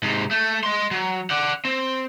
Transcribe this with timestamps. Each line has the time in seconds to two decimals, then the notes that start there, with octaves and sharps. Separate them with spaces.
0.03 G#2 C3
0.31 A3
0.63 D#5 C6
0.91 F#3
1.30 D5 F#5
1.65 C4